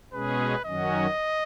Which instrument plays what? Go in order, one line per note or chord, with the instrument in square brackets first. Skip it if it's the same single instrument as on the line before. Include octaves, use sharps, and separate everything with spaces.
[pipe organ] B2 G#3 C#4 G#4 [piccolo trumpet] B4
[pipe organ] F#2 D#3 F#3 C#4 F#4 [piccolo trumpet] D#5